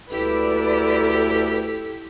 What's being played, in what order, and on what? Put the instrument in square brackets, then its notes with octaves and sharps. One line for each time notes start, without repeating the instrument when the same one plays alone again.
[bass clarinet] D2 [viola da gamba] E4 G4 [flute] A4 [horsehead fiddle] B4 D5